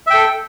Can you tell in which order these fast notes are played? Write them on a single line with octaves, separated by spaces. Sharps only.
E5 G5 A4